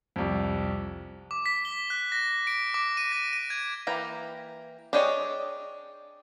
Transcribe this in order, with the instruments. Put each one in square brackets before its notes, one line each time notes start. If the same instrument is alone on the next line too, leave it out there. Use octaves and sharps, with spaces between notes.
[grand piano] C2 F2
[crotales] D6
B6
G7
F#6
A#6
D7
D6
D#7
A#6
D#7
G#6
[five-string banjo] E3 A#3 G4 A#5
D4 G4 G#4 C#5 D#5